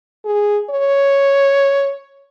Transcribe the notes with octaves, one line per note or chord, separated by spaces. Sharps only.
G#4
C#5